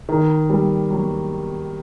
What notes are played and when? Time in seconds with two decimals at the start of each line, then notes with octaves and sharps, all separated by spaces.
0.09 D#3
0.50 G3
0.91 F#3